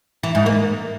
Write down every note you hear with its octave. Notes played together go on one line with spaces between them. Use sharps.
E3
G#2
A#3